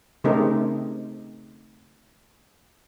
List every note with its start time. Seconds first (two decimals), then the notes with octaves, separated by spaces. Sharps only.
0.24 C#3 A3 C4 D#4 G4 A#4